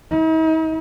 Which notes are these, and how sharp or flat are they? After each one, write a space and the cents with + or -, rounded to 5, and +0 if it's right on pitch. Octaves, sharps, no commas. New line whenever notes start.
D#4 +45